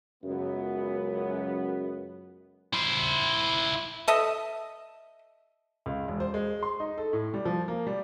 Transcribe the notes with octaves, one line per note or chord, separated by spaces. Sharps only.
C#2 F#2 B3
E4 C5
A4 D#5 E5
C#2
E1
C5
G#3
C6
D#4
A4
A2
G3
F3
A#3
G3